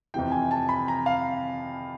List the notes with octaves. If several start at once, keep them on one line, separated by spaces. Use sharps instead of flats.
F2 C3 E3 G5
G#5
A5
B5
A#5
F5